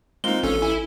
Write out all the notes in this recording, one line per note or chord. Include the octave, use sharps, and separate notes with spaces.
G#3 A#3 C4 D#4 F4 G7
A1 C#4 A4
E4 G#5